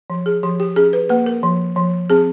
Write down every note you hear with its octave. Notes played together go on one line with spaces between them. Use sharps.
F3
G#4
F3 G4
G4
C#4 G#4
B4
A#3 B4
A#4
F3
F3
C4 G#4